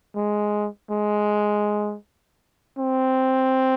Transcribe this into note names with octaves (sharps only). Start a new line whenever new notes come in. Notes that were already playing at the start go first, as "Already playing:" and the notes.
G#3
G#3
C4